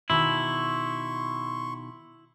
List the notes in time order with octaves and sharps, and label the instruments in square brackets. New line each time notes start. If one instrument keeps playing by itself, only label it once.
[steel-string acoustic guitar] B2 D#3 [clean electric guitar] E4 [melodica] C6 C#6